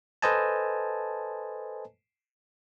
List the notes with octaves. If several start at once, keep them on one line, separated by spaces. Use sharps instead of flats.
A4 B4 C5 D#5 G#5 A5